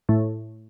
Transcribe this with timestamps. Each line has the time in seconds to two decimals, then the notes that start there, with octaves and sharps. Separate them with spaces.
0.09 A2